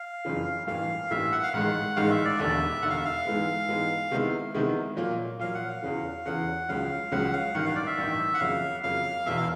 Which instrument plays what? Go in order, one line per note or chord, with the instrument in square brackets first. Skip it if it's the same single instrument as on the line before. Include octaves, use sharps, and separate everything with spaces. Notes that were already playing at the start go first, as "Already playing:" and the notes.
Already playing: [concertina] F5
[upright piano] F#1 F2 C#3 E3
[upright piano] A1 G2 E3 G3 A#3 [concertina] F5
[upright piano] A1 G2 E3 G3 A#3 [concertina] E5
[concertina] F#5
F5
[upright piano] A1 G#2 D#3 G#3 [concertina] F#5
[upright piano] A1 G#2 D#3 G#3 [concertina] F5
[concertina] E5
D5
[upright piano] E1 D#2 D3 [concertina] E5
[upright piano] E1 D#2 D3 [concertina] F#5
[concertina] F5
E5
F5
[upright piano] G#2 E3 G#3 B3
G#2 E3 G#3 B3
C3 D#3 G#3 B3 E4
C3 D#3 G#3 B3 E4
A#2 F#3 A#3
[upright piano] A#2 F#3 A#3 [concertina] F5
[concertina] F#5
F5
[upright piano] E2 C#3 E3
[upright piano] E2 C#3 E3 [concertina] F#5
[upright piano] C#2 C#3 F#3 [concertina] F5
[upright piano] C#2 C#3 F#3 [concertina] F#5
[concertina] F5
[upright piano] A1 G2 D#3 [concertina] F#5
[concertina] F5
D5
E5
[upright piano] A1 G2 D#3
[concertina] F#5
[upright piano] F2 C#3 F#3 A#3 [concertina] F5
[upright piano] F2 C#3 F#3 A#3 [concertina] F5
[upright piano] E1 E2 B2 [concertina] E5
[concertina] F5